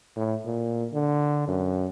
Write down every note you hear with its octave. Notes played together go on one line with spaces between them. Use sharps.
A2
A#2
D3
F#2